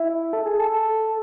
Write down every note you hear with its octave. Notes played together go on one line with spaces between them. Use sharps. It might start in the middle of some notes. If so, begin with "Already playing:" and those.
Already playing: E4
A4
G#4
A4